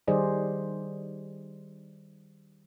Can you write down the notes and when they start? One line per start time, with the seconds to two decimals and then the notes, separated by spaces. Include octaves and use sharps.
0.08 D#3 G3 G#4 C5 D5 D#5